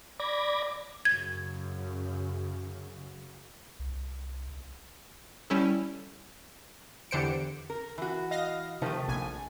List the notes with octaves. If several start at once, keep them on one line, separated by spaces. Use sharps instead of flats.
D5 B5 D6 G#6 A#6
F#2 C#3 G#6
C2
G3 C#4 E4 A4
E2 D3 G4 C5 C#7 D7
A#4
E3 F#4
D#5 F5 A#6
C3 D#3 F3 A3
A#1 G#5